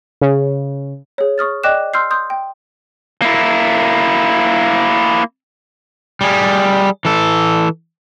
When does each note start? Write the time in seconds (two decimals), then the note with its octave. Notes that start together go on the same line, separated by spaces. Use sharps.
0.22 C#3
1.18 G#4 C#5
1.38 C#6 D#6 F6 A6
1.64 D5 D#5 G5 D6 F#6 E7
1.94 C6 E6 F6 G6 C7
2.11 C6 D#6 G6
2.30 G5
3.22 A#3 E4
6.21 G3 G#4
7.05 E3 A4